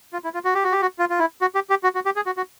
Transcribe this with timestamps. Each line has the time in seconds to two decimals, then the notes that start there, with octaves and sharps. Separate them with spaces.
0.13 F4
0.24 E4
0.34 F4
0.45 F#4
0.55 G4
0.64 F#4
0.72 G4
0.82 F#4
0.99 F4
1.10 F4
1.19 E4
1.41 F#4
1.55 G4
1.70 G4
1.83 F#4
1.95 F#4
2.05 G4
2.16 G#4
2.26 F#4
2.37 F#4